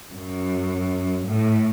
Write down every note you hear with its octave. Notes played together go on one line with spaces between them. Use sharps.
F#2
A2